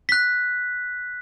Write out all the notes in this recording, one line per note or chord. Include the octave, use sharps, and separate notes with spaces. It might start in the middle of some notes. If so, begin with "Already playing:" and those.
F#6 B6